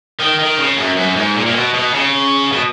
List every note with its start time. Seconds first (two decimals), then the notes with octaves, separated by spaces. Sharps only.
0.19 D#3
0.39 D#3
0.58 C#3
0.77 F#2
0.97 F#2
1.16 G#2
1.36 A#2
1.46 A#2
1.55 B2
1.74 B2
1.94 C#3
2.52 B2